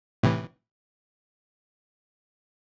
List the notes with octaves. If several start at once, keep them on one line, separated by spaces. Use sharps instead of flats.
A2 C3 E3